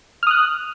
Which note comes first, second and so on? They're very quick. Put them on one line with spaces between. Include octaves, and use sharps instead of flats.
F6 D#6 F#6